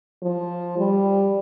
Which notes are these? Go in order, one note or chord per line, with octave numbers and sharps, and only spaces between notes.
F3
G3